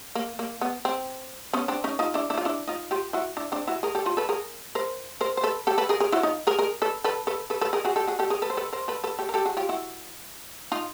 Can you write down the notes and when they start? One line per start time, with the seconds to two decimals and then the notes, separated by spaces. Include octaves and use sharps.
0.15 A#3
0.39 A#3
0.61 B3
0.85 C4
1.53 B3 C#4
1.68 C4 D4
1.84 C#4 D#4
1.99 D#4 F4
2.14 D4 E4
2.30 D4 E4
2.38 F4
2.45 D4 E4
2.67 D#4 F4
2.91 F4 G4
3.13 E4 F#4
3.37 D4 E4
3.52 C4 D4
3.67 E4 F#4
3.83 G#4 A#4
3.95 G4 A4
4.05 F4 G4
4.17 A4 B4
4.29 G#4 A#4
4.75 A#4 C5
5.21 A#4 C5
5.37 C5
5.44 A4 B4
5.67 G4 A4
5.78 A4 B4
5.89 G#4 A#4
6.00 G#4 A#4
6.12 E4 F#4
6.23 D#4 F4
6.47 G#4 A#4
6.59 G#4 A#4
6.82 A4 B4
7.04 A4 B4
7.27 A4 B4
7.50 A4 B4
7.61 A4 B4
7.73 G#4 A#4
7.85 F#4 G#4
7.96 G4 A4
8.07 F#4 G#4
8.19 G4 A4
8.30 G#4 A#4
8.42 A4 B4
8.50 C5
8.57 A4 B4
8.73 A#4 C5
8.88 A4 B4
9.04 A4 B4
9.19 G4 A4
9.29 A#4
9.34 G4 A4
9.45 F#4 G#4
9.57 F4 G4
9.69 E4 F#4
10.72 D#4 F4